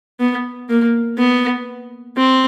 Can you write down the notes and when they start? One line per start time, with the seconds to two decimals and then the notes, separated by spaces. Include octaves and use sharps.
0.20 B3
0.70 A#3
1.18 B3
2.17 C4